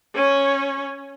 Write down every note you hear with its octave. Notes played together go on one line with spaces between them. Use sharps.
C#4 C#5